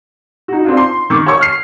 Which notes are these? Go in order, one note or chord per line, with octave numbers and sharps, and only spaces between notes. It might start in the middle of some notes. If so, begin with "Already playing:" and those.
D#4 F#4
C4 D4 F4
C6
D#3 C#6 D6
C#5 C#6
F6 C7